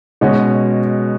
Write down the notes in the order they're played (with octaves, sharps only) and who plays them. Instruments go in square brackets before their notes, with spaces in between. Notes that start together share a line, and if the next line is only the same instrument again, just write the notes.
[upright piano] B2 G#3 C#4 F#4